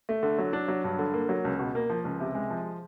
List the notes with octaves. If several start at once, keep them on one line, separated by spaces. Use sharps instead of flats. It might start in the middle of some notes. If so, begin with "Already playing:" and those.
A3
D3
F#3
D4
F#3
G2
D3
A#3
F#3
C#2
B2
A#3
F3
C#2
C3
G#3
F3